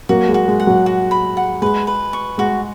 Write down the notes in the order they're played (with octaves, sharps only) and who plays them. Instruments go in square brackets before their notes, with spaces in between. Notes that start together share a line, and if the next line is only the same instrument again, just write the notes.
[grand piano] F#3 A#3 [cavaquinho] F#4
[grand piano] G#3
[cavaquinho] F#4
[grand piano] G#3
[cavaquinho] F#5
[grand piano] F#3
[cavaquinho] F#4
B5
F#5
[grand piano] G#3 [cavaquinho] B4
[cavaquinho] B4
C#6
[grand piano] G#3 [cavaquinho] F#4